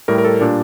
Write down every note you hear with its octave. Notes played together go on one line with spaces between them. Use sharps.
A2 G3 A#4
A#4
A4
A#2 G3 D4